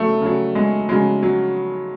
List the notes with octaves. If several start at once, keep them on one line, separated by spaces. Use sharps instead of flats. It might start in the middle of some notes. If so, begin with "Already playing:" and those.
Already playing: C#3 F#3 A3
C#3 F#3
G#3
C#3 F#3 G#3
F#3